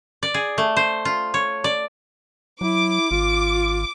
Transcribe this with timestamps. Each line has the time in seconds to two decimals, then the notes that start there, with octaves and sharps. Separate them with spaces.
0.23 D5
0.34 G#4
0.58 A3
0.77 C5
1.05 F4
1.34 C#5
1.64 D5
2.61 F#3 E4 D6
3.11 G#1 F4